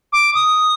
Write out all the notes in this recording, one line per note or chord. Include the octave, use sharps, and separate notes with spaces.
D6
D#6